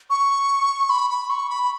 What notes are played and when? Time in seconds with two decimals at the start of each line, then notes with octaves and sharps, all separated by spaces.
0.10 C#6
0.90 B5
1.10 B5
1.30 C#6
1.50 B5